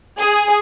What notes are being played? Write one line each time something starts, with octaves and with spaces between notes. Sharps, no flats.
G#4